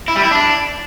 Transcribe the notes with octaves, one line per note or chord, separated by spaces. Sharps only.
E4
G3
E4
D4